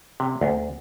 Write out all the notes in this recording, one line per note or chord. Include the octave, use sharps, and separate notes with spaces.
C3
D2